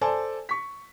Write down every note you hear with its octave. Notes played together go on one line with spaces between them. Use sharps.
A4 C5 D5 G#5 A5
C#6 B6